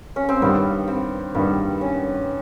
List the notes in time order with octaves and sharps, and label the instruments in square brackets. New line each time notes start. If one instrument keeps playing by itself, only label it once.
[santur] C#4
C4
[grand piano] G2 D#3 G3 [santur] B3
[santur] C4
[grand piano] G2 D#3 G3 [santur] B3
[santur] C#4